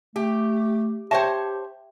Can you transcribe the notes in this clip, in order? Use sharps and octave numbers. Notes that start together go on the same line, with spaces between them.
A3 G4
G4 C5 C#5 E5 G5 A5